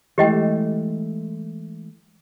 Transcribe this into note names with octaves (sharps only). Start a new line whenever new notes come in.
E3 G#3 A3 G4 D#5 G5